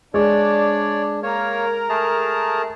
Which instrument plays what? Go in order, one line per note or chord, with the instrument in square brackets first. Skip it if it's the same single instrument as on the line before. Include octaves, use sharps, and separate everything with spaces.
[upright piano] G#3 [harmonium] D4 [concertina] C#5 D5
[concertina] A#3 C#5 [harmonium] A#4
[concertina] A3 G#4 A5